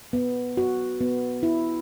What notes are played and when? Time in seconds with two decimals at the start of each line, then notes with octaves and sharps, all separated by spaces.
0.13 B3
0.57 F#4
1.01 B3
1.43 E4